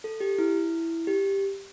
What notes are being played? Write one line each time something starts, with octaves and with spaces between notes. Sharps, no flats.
A4
G4
E4
G4